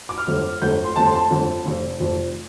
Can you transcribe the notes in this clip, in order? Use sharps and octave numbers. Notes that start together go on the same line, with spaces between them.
D6
F6
G1 F2 D3 A3
G1 F2 D3 A3 G6
C6
G1 F2 D3 A3 A5
C6
A5
G1 F2 D3 A3
F1 F2 F3
F1 F2 F3